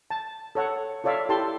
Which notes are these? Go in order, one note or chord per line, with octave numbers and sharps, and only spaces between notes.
A5
A4 C#5 F#5
F4 A4 C#5 D5 E5 F5
E4 G4 A4 A5 C6